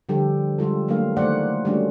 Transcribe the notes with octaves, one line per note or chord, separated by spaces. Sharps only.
D3 F3 G3 G4 A4
G3 G#3 F4 A4
F#3 A3 A#3 D4 F5
D#3 A3 A#3 C5 D5 F#5
G3 A3 C#4 D4 F#4